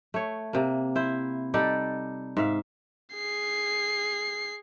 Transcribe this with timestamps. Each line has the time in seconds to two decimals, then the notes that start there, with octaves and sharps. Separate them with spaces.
0.14 A3 C#5
0.53 C3 A#3
0.95 E4 C5
1.54 G3 D#4 A4 D5
2.37 G#2 E5 F5
3.14 G#4 C7